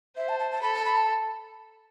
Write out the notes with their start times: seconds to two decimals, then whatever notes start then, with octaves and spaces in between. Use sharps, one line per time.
0.17 C5 E5
0.29 A5
0.40 A5
0.51 A5
0.62 A4 B5
0.74 A5
0.85 B5
0.97 A5